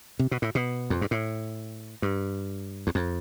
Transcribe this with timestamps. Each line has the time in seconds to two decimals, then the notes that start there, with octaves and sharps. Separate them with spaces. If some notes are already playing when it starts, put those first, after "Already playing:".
0.19 C3
0.31 B2
0.42 A2
0.55 B2
0.90 F2
1.01 G2
1.11 A2
2.02 G2
2.87 E2
2.95 F2